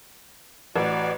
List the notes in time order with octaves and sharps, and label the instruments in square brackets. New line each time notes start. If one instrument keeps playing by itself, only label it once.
[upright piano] A1 [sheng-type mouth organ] F#4 D5